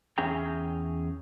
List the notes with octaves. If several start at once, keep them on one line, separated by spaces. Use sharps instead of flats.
E2 C#4 G#4 E5 G5 A#5